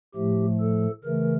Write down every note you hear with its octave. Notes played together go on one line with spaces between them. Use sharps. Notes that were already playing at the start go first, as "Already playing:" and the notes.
A2 F3 A3 G4
A4
C#3 E3 A3 A#4